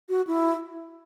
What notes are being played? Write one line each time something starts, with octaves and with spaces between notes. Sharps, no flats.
F#4
E4